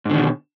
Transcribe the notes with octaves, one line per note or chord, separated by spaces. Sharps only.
G#2 B2 D3 D#3